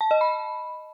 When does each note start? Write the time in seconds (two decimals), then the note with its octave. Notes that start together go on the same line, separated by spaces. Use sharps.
0.01 A5
0.11 D#5
0.21 B5